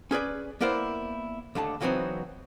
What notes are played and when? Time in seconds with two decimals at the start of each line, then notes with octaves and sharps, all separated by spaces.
0.11 C#4 G#4 B4 D5
0.61 A#3 B3 E4 A#4 C5 D5
1.55 D#2 D3 A3 A5
1.80 C#3 E3 F#3 B3 C4 D#4